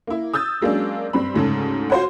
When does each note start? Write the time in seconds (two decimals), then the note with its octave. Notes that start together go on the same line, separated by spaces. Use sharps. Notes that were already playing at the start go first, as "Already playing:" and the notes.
0.07 A#3 E4
0.34 D#6 E6 G6 A6
0.61 F#3 G#3 A#3 C#4 D4
1.13 G2 G3 C4 B5
1.34 D2 G#2 C#3 A4
1.90 F4 F#4 C5 C#5 F#5